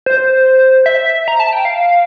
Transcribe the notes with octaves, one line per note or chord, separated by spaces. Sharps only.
C5
E5
A#5
A5
G5
F5